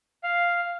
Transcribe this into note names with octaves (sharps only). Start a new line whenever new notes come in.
F5